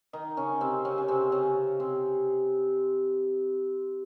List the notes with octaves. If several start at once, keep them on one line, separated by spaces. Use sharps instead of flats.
D#3 D#4
C#3 C#4
C3 C4
C#3 C#4
C#4
C3 C4
C#3 C#4
C3 C4